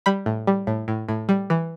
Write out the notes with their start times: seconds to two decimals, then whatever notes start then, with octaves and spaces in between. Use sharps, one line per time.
0.06 G3 B5
0.26 A2
0.47 G3
0.67 A2
0.88 A2
1.09 A2
1.29 G3
1.50 E3